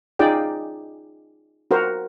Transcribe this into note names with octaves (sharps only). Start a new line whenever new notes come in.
D#4 F4 G#4 D5 G5
F#4 A#4 C5